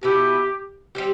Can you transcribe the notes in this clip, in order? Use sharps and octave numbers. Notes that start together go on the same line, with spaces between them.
B2 B3 E4 G4
G3 C4 G4